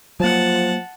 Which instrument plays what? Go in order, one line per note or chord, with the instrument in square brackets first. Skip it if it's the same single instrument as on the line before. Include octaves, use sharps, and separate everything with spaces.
[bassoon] F3 [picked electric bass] F#3 A#3 [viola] F#5 A5